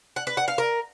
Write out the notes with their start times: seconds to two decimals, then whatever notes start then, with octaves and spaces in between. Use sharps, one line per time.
0.16 F#5
0.27 B4
0.37 F#5
0.48 F5
0.58 A#4